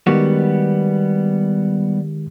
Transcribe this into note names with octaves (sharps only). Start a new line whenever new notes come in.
D#3 G3 G#3 B3 F#4 G4